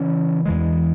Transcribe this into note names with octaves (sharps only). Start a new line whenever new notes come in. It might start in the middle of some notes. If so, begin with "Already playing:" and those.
Already playing: C#3 E3 C#4
E2 E3 G#3